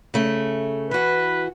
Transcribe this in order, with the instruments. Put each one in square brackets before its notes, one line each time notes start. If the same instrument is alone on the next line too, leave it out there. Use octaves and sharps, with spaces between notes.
[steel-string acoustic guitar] C#3 A3
[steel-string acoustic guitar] E3 F#4 [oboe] B4